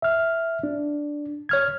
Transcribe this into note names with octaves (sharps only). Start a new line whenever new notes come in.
E5 F6
D4
C#5 F6 G#6